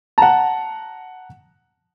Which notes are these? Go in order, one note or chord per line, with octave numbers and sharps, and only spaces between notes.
F#5 A5 A#5